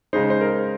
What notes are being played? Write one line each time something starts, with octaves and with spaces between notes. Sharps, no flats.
C#3 G#3 D#4 C5
C5
A#4